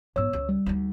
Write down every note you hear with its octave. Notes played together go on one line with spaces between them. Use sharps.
G#2 B3 C#5 E6
C#2
G3
D2 D#4